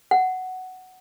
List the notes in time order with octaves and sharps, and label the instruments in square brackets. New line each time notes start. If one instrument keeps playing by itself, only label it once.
[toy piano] F#5